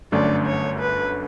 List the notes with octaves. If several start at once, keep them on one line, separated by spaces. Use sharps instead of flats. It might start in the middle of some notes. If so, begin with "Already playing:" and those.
G1 F#2 D3 A3 C#4 D5
C#5
B4